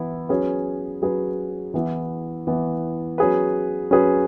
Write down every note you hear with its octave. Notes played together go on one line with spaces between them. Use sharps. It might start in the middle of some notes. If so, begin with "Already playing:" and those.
Already playing: E3 B3 E4
F#3 C#4 G#4 B4
F#3 C#4 G#4 B4
E3 B3 E4
E3 B3 E4
F#3 C#4 G#4 B4
F#3 C#4 G#4 B4